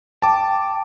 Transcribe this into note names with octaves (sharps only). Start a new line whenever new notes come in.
G5 A5 D6